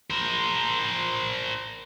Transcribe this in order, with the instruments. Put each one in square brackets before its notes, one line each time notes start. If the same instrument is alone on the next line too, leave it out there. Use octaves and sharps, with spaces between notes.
[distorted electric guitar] A#4 C5